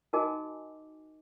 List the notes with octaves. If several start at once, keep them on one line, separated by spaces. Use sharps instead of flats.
D#4 F#4 A#4 D#5 G#5 D6